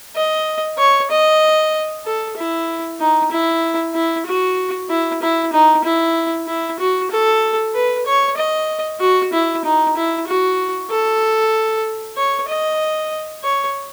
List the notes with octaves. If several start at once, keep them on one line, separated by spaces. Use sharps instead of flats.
D#5
C#5
D#5
A4
E4
D#4
E4
E4
F#4
E4
E4
D#4
E4
E4
F#4
A4
B4
C#5
D#5
F#4
E4
D#4
E4
F#4
A4
C#5
D#5
C#5